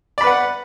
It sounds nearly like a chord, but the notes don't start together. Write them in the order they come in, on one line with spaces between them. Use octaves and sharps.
D5 B5 B4 F#5